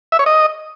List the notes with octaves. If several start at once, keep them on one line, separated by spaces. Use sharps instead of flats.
E5
C#5
D#5